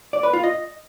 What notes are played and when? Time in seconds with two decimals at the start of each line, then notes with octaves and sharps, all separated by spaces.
0.13 D5
0.23 B4
0.33 F4
0.44 D#5